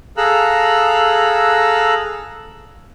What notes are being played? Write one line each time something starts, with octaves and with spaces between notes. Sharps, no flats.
G#4 A4 F5 A#5 E6 F#6